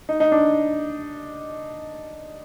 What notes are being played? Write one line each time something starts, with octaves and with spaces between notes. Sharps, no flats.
D#4
D#4
D4